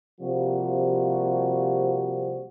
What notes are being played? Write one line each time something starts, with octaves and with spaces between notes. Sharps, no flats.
C3 F3 G3 A#3 C4 F#4